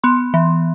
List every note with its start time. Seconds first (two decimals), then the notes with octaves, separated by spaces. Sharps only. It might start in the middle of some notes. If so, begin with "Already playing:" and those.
0.04 B3 C6
0.34 E3